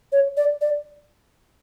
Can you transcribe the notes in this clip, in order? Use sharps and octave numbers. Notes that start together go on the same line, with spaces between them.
C#5
D5
D5